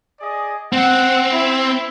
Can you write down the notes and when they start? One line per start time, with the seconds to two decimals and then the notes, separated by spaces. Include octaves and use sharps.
0.20 G#4 D5 D#5
0.73 C4 F#5
1.33 E4